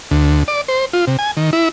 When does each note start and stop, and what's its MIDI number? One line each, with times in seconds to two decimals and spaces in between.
0.11 0.43 38
0.48 0.61 74
0.68 0.85 72
0.93 1.05 65
1.07 1.17 48
1.19 1.31 80
1.37 1.50 51
1.53 1.69 64